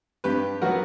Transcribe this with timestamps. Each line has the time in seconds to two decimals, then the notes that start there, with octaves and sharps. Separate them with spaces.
0.24 G2 G4 B4
0.62 F#3 B3 F#4 A#4